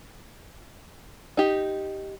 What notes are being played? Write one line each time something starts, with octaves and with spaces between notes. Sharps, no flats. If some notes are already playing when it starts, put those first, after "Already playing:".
D#4 G4